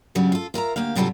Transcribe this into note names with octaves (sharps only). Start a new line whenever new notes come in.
G2 C#3 F#3 G3
F4 A4
F4 A#4 E5 A#5
D2 A#3 G4 F5
G2 C3 F#3 G3 F4 A4